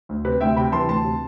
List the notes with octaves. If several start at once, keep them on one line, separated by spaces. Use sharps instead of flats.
D2
C3 B4
D2 E5 G5
C3 G5 B5
E3 A5 C6
D2 A5 C6
C3